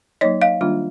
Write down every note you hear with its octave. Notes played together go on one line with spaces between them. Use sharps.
F#3 A#3 D#4 C#5 D#5
D#5 F5
D#3 G3 A#3 D4 F4